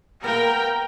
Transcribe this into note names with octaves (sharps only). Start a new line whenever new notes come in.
A#3 B3 A#4 G5